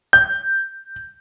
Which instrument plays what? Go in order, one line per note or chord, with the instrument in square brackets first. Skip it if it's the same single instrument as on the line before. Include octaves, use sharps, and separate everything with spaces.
[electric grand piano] G6